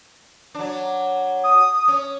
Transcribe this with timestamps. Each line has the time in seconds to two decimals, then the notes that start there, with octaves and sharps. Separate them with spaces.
0.54 F#3 D4
1.44 D#6
1.88 C#4